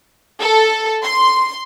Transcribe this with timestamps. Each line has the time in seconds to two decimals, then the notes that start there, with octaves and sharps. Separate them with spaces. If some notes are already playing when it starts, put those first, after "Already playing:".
0.40 A4
1.03 C6